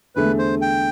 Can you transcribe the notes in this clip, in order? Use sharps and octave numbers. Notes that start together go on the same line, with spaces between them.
E2 D3 A3 B4
C5
G5